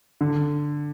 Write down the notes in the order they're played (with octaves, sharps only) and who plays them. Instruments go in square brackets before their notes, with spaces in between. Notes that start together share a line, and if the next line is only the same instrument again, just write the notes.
[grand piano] D3